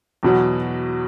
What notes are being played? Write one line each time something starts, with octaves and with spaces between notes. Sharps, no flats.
E2 B2 F#3